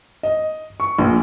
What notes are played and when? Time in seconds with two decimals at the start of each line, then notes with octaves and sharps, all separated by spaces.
0.23 D#5
0.80 C#6
0.99 A#1